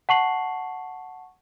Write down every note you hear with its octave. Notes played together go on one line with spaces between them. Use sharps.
F#5 A5 C#6 C7 F#7